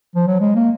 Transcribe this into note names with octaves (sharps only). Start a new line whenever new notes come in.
F3
F#3
G#3
A#3